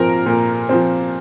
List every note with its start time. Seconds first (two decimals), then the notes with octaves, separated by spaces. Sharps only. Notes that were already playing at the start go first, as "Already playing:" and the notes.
Already playing: A#2 F3 C4 A#4
0.26 A#2
0.69 F3 C4